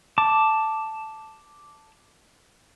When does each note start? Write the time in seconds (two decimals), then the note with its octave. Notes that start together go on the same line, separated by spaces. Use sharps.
0.18 A5 D6